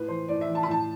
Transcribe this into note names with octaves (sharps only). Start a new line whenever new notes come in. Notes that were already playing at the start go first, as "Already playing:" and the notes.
Already playing: A2 B4
E3 C5
A2 D5
E5
E3
A5
B5
A2 A5